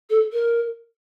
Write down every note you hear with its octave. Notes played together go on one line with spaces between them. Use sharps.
A4
A#4